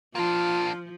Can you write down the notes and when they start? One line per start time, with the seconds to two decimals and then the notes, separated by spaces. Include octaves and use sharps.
0.15 F3 A#3 D4 F4